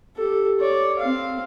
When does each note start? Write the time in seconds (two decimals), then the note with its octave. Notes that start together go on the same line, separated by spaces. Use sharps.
0.16 G4 A4
0.60 C#5 D5
0.99 C4 F5